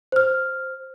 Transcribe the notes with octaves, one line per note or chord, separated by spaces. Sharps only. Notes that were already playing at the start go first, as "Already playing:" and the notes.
C5 F6